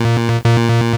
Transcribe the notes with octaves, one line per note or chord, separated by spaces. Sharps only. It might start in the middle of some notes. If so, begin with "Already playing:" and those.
Already playing: A#2
A#2